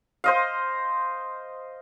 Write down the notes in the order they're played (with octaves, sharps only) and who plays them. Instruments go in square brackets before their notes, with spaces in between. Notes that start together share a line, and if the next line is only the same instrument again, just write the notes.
[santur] C5 D#5 F5